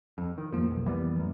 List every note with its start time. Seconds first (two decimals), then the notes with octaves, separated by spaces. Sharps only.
0.18 F2
0.38 D#3
0.53 A1 F2 F3 A#3
0.71 B1
0.86 E3 G3 B3
1.16 A1 F#2